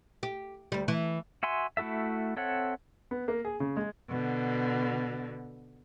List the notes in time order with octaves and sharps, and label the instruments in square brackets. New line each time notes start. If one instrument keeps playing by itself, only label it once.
[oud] G4
D2 G3
E3
[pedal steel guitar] F#4 E5 G#5 C6
A3 E4 F#4 A4 E5
C4 A4 C#5 E5 F#5
[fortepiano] B3
A#3
G#4
C#3
G#3
[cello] B2 D3